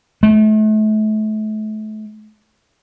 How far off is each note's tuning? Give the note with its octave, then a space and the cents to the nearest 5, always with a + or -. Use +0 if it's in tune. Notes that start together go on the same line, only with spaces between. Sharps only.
A3 -35